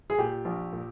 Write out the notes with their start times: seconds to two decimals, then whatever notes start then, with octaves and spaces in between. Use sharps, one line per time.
0.10 G#4
0.18 A#2 G4
0.45 A#1
0.73 A#2